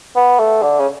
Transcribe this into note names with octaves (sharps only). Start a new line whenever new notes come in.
B3
A3
D3
C#3